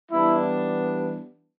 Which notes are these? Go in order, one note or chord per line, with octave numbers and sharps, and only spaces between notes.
E3 G3 B3 D4 E4